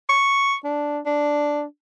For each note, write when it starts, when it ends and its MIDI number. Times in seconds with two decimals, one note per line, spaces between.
0.09 0.55 85
0.64 0.99 62
1.06 1.63 62